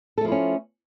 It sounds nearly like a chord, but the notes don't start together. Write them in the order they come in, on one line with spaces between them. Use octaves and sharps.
A4 A3 F3 E4 C#4